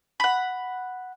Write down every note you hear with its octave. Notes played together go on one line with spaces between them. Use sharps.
F#5 B5